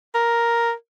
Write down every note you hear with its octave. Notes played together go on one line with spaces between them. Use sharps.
A#4